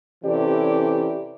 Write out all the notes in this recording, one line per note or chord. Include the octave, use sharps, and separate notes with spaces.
C3 E3 C#4 G4 A4 D5